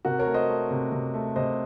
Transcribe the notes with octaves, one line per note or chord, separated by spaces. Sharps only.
C3 F#4 A#4
A#4 C#5
A3
C5 D#5
A3
C3
C3
A3
C3 C5 D#5